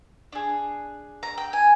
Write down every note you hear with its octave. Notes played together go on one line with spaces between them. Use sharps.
D4 G#4
A#5
G5
G#5